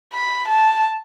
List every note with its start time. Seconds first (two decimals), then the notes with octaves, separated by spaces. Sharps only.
0.14 B5
0.48 A5